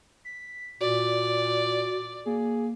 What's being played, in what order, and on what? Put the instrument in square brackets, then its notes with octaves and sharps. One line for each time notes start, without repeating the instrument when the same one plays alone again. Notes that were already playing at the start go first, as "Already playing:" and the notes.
[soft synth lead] B6
[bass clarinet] A#2 [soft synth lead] F#4 [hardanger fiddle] D5
[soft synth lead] A#3 [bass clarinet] G#4